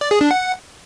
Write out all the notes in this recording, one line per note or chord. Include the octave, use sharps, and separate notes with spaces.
D5
G#4
D4
F#5